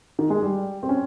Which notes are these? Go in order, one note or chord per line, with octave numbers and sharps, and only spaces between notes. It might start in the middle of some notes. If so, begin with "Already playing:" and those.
D#3
G#3
G3
C4
C#4